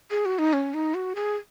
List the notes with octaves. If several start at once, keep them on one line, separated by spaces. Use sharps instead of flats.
G#4
F#4
D#4
C#4
D#4
F#4
G#4